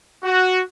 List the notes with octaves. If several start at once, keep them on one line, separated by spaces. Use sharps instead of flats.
F#4